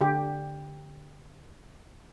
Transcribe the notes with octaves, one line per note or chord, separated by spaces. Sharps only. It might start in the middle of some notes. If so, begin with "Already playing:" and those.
D3 G4